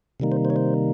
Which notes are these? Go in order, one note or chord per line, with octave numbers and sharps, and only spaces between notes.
C3 D#3 G3 A#3 D#4
C5
C5
C#5
C5